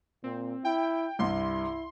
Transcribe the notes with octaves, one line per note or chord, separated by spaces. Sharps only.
A#2 C4
E4 G5
C2 G2 E4 C6